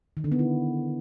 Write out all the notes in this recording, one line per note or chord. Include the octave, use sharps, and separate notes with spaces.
D#3
D3
B3
E4